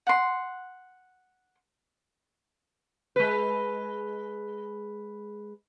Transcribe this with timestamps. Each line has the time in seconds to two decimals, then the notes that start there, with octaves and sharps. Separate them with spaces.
0.07 F#5 C6
3.16 G#3 B4